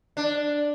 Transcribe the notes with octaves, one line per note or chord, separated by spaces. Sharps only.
D4